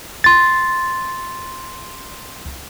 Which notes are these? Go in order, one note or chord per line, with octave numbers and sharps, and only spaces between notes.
C6 A6